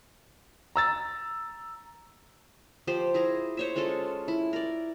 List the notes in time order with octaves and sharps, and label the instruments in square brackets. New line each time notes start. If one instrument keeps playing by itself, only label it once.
[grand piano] A#5 E6 A6
[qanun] F3 G4 C5
E4 G#4 A#5
C5 C#5 E5
G#3 C#4 F4 A4
E4
A#4 D5